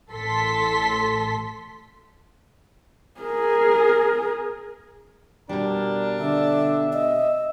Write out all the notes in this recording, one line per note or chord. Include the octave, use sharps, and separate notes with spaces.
A1 A4 C6 B6
G#4 A#4
B2 G3 D4 A#4
D3 E5
D#5 E5